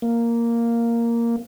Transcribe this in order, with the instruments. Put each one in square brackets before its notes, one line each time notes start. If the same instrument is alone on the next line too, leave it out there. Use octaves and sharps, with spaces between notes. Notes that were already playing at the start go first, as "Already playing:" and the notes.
[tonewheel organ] A#3